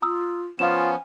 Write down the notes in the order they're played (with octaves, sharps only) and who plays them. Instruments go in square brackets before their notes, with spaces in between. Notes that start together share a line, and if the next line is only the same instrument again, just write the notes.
[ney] F4 [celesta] A#5 D#6 E6
[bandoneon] F3 B3 C#4 [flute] F4 [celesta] F5 E7 [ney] G#5